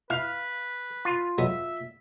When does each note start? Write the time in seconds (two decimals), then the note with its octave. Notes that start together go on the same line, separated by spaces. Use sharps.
0.10 E4 B4 F5
1.05 F4
1.38 F#3 G#3 B3 E5